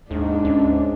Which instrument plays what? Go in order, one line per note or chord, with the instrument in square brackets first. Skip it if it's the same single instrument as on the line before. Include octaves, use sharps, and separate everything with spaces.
[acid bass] D#2 [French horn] G#2 [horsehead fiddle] D4
[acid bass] D2 [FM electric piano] C#4